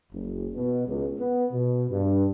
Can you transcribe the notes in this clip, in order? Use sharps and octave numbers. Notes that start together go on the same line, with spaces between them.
F#1
B2
C#2
B3
B2
G2